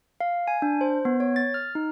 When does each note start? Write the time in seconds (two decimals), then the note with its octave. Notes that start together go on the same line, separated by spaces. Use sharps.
0.21 F5
0.48 G#5
0.62 D4
0.81 C5
1.05 B3
1.20 C#5
1.36 A6
1.54 F6
1.75 D#4